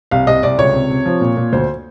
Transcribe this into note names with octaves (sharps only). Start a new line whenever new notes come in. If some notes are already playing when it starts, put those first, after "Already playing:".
C2 F5
C2 D#5
C2 D5
C#2 C#5
C3
C3
F3
A#2
A#2
D2 C5